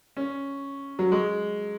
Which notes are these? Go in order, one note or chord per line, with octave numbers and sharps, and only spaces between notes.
C#4
F#3
G#3